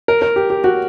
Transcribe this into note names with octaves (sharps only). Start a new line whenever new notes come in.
A#4
A#4
G4
G4
F#4